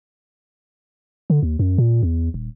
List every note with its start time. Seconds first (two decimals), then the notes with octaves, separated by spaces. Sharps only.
1.30 D3
1.43 D#2
1.59 F#2
1.78 A#2
2.03 E2
2.34 D#1